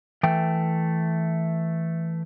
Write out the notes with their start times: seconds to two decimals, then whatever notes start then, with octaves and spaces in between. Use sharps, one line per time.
0.23 E3 A3 G5